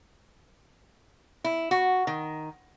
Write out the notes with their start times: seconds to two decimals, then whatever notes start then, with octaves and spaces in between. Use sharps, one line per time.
1.44 E4
1.71 F#4
2.07 D#3